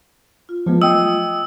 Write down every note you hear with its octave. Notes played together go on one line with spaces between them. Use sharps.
F4
F3 F#3 G#3 A3 B3 F4
D#5 G5 D#6 E6